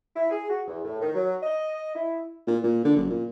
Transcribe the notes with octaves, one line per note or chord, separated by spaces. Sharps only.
E4
G#4
F#4
E2
A2
D#3
F#3
D#5
E4
A#2
A#2
D3
F#1
A#2